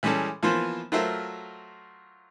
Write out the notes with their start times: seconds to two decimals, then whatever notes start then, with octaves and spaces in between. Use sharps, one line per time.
0.03 E3 G3 G#3 C#4 G#4 A4
0.43 E3 F3 A#3 B3 F4 C5
0.92 F#3 A3 F4 A#4 C5 E5